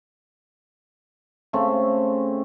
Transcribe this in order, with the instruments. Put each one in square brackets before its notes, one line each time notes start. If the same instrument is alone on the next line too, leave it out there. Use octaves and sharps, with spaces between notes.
[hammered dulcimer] C#3 A3 C4